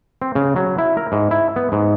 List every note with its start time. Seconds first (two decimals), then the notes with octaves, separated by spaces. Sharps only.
0.22 C4
0.35 C#3
0.56 F#3
0.78 E4
0.97 A#4
1.12 G#2
1.31 E4
1.56 B3
1.72 G#2